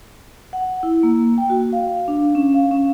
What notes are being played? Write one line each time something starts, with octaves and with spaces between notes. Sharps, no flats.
F#5
E4
A#3
G5
F#4
F5
D4
C#4
F5
C#4